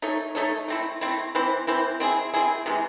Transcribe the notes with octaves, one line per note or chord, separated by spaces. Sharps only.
A3 D#4 A4 C#5
A3 D#4 A4 C#5
A3 C4 E4
A3 C4 E4
E3 C4 E4 C5
E3 C4 E4 C5
C4 E4 G#4
C4 E4 G#4
C3 E3 G#3